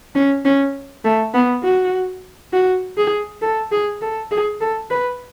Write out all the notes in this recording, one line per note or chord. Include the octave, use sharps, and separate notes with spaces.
C#4
C#4
A3
B3
F#4
F#4
G#4
A4
G#4
A4
G#4
A4
B4